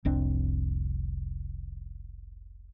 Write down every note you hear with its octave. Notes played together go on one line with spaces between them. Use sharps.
F1 C2 C4 D4